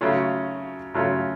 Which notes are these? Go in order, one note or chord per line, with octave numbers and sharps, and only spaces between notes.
C#3 F#3 A3 C#4 F4
C#3 F#3 A3 C#4 F4